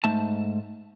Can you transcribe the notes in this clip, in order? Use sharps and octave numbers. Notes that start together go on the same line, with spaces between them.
G#2 A3 A5